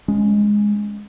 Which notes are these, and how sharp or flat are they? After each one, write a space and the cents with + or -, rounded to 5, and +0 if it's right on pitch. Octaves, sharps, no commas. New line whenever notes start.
G#3 +0 C#4 +0